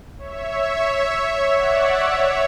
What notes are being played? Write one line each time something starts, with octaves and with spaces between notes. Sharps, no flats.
C#5 E5
D5 F#5
C#5 E5